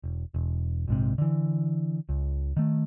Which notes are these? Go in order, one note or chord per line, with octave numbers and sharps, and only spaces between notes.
E1
E1
A#1 G#2 C3
D3 E3
C#2
D#3 A3